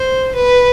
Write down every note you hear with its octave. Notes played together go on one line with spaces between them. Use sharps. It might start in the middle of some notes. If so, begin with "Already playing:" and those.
Already playing: C5
B4